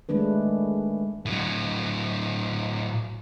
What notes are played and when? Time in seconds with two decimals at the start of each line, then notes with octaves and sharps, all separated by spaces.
0.09 D#3 G#3 A3 D4 B4
1.26 A2 F#3